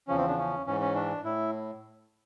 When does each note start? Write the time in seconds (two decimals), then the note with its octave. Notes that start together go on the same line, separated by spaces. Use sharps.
0.08 E2 C#3 F3 C#4
0.17 C4
0.28 D4
0.38 C#4
0.66 G#2 E3 C#4
0.81 C#4
0.95 D4
1.25 A2 E4